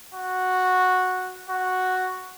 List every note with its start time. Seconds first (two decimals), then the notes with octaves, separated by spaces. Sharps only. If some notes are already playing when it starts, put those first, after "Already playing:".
0.14 F#4
1.49 F#4